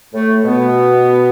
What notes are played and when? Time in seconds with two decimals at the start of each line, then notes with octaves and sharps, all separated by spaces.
0.14 A2 A3
0.45 B2 B3